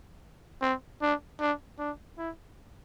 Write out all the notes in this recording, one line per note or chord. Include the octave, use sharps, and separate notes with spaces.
C4
D4
D4
D4
E4